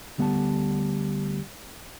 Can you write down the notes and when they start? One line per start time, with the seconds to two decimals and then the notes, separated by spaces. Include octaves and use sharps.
0.18 D2 G3 B3 E5 F#5 A5